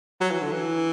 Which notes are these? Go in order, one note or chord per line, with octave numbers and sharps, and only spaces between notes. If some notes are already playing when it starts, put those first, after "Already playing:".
F#3
E3
D3
E3